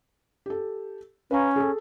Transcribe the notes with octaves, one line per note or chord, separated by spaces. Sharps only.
G4 A4
C#4 B4 F5 A#5
G#4 A4